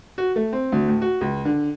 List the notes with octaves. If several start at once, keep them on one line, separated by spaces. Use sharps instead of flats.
F#4
A3
C4
D2
A2
F#4
C#2
D3